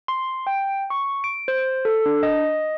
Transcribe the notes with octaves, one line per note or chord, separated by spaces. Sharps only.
C6
G5
C#6
D7
C5
A4
D4
D#5